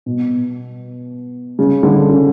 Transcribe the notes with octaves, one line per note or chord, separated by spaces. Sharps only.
B2
C#3
D3
C#3